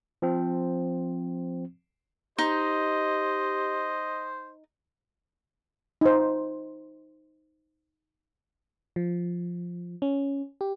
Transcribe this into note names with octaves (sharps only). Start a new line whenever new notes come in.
F3 C4
D#4 G4 C5 D#5
D#4 C5
F3
C#4
G4